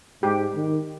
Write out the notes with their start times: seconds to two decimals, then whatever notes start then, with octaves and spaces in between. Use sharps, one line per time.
0.23 G#2 G4
0.55 D#3